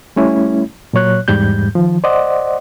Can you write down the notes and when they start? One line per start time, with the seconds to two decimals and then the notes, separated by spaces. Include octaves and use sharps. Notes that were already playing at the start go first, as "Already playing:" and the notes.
0.16 G3 A3 C#4 E4
0.93 A#2 F#3 C#5 F#6
1.28 E2 G#2 G3 G6
1.75 D#3 F3
2.04 C5 D5 D#5 F#5